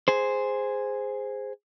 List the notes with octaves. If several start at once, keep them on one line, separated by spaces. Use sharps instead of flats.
G#4 C5